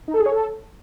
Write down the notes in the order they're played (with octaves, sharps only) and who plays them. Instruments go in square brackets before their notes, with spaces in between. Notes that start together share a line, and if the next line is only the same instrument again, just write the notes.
[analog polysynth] D#4
A4
G#4
C#5
A4